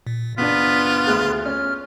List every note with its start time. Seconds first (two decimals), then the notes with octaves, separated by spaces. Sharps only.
0.07 A#2
0.38 F#1 B3 D4 F4 B6
1.07 D2 G#4 F6 F#6
1.46 C#4 F6